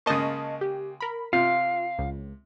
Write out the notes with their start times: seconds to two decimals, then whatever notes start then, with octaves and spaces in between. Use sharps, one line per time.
0.06 C#3 G#3 A#3 D#5 A5 C#6
0.61 G4
1.00 A#4 B5
1.33 C3 F4 F5
1.99 C#2